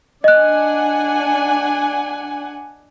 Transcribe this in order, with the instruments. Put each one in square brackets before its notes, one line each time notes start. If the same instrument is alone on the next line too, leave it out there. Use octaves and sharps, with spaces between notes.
[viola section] D4 F#5 G#5 [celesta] D#5 F#6